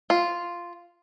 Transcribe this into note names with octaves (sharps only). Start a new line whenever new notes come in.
F4